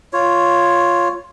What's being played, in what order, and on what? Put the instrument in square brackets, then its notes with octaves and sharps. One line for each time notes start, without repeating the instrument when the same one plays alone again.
[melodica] F4 C#5